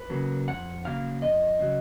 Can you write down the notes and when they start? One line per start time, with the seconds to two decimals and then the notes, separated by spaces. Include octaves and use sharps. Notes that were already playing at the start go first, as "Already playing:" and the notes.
Already playing: B4
0.10 C#3 F#3 A#3
0.48 F2 F#5
0.85 C#3 F#3 A#3 F5
1.22 F2 D#5
1.59 C#3 F#3